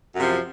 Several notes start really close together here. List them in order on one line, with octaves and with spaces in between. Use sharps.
F#2 C3 F3